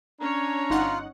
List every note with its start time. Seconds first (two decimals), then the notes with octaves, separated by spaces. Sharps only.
0.20 C#4 D4 C#5 A#5
0.70 G1 D#4 F4 F#5